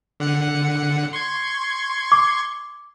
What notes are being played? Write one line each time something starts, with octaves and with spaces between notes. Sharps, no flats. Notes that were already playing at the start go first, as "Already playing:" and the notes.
D3 F#5 C#7
C6 C#6 G#6
D6